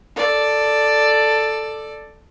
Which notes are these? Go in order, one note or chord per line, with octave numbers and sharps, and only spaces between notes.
A4 D5